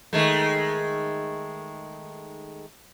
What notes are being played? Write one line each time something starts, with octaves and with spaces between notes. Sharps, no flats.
D#3 G#3 A3